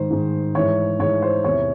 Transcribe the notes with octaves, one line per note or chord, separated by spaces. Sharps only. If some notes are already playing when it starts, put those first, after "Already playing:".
Already playing: G#2 D#3 C5
G#2 D#3
G#2 E3 C#5
G#2 E3 C#5
C5
E2 C3 E3 C#5